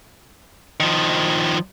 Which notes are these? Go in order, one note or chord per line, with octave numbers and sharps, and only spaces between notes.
D#3 F3